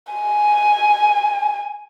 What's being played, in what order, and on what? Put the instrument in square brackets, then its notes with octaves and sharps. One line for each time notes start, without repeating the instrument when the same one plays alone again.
[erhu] G#5